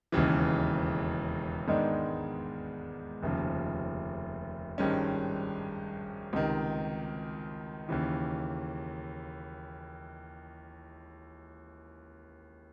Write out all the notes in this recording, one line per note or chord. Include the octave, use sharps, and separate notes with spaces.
E1 D#2 C#3 E3
G#2 D#3 G#3 B3 D4
F1 D#2 C#3 F3
G#1 G2 D#3 G#3 C#4
C#2 C3 D#3
D#2 C#3 E3